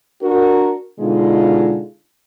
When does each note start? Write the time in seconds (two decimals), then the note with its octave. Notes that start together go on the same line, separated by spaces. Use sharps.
0.22 D4 F#4 A#4
1.00 B2 D3 G#3 D#4 F4